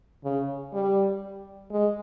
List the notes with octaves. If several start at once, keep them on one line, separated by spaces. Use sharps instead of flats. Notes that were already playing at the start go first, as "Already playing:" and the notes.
C#3
G3
G#3